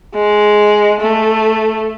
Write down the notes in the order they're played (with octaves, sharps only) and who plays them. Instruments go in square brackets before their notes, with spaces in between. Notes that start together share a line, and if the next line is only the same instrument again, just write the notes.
[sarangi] G#3
A3